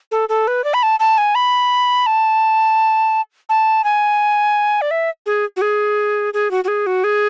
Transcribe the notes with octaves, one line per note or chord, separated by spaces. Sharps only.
A4
A4
B4
D5
B5
A5
A5
G#5
B5
A5
A5
G#5
D5
E5
G#4
F#4
G#4
G#4
F#4
F#4
G#4
F#4
G#4